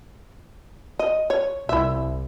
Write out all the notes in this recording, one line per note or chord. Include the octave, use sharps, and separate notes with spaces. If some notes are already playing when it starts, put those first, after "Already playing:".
D#5
C#5
C2 E4 E5